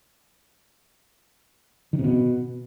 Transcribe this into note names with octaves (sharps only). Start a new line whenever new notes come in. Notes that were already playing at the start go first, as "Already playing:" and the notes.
D#3
C3
B2